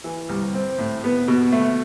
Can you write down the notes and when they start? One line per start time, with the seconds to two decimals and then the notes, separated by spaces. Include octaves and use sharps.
0.04 E3
0.29 C2
0.54 C4
0.78 A2
1.04 B3
1.28 B2
1.52 A3